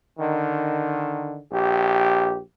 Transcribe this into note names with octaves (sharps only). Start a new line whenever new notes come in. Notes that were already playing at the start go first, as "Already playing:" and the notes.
D3 D#3
A#1 G4